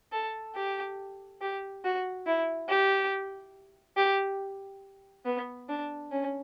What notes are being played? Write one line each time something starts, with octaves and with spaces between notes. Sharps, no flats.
A4
G4
G4
F#4
E4
G4
G4
B3
D4
C#4